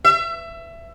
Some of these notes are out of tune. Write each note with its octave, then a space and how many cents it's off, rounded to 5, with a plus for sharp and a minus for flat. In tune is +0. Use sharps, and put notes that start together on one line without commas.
E5 +20